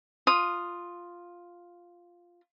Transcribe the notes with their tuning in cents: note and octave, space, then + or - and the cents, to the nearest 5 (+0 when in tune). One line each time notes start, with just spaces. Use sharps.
F4 +0 D#6 +0